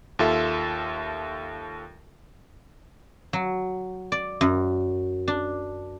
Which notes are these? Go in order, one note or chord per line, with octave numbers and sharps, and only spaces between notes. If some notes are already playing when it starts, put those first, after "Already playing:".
D#2 F4 A4 E5
F#3
D5
F#2
D4